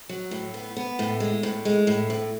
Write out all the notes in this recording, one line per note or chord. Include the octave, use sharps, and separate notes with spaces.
F#3
A2
B3
B3
A2
G#3
A2
G#3
A2
A2